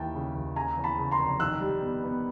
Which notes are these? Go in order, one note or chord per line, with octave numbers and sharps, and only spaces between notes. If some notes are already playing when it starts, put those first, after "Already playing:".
Already playing: D#2 E3 G5 A5
C#3
D#2
C#3 G#5 A#5
E2
A5 B5
C#3
A#5 C6
F1
D#3 E6 F#6
G3
B3
B3